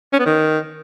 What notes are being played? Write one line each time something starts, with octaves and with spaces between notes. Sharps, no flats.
C#4
B3
D#3